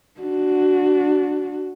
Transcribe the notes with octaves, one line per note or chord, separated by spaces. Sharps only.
D4 F#4